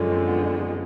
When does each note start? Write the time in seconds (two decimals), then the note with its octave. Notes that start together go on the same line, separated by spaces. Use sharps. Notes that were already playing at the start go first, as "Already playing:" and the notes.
Already playing: F#2 D3 F3 G#3 C#4 D4
0.10 C4
0.27 B3
0.45 D4
0.55 D#4
0.62 D4